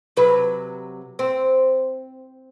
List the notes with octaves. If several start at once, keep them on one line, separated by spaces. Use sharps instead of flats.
C3 F#3 B4
C4